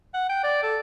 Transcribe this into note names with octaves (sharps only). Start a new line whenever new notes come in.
F#5
G5
D5
A4